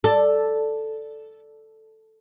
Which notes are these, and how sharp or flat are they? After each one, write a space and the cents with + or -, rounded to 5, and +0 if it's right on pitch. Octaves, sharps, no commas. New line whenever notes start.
A4 +0 D5 +0